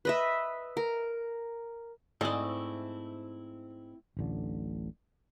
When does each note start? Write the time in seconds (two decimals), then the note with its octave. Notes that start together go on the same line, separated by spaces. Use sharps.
0.05 B4 D#5 E5
0.77 A#4
2.21 G#2 A3 C4 E4 G#4 A4 D5 D#5
4.17 D1 A1 D3